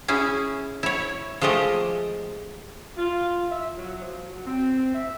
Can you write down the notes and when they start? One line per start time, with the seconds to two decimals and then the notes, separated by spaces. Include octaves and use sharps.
0.08 C#4 E4 G#4
0.83 E4 C#5
1.41 F3 G#3 A3 G4 D#5
2.97 F4
3.50 E5
3.77 F#3
4.00 F3
4.26 F#3
4.45 C4
4.94 E5